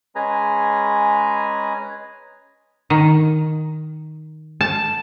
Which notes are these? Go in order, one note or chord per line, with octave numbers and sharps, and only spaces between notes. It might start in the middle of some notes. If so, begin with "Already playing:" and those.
G#3 C#4 G#4 B4 G#5 A#5
D#3
A5